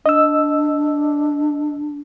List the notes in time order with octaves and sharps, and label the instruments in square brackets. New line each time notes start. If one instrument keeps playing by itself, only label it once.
[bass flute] D4 [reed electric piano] D#5 E6